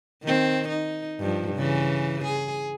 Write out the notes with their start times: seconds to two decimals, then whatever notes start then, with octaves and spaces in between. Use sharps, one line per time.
0.23 D#3 C4
0.69 D#4
1.19 G2 F3
1.56 C#3 E3
2.24 G#4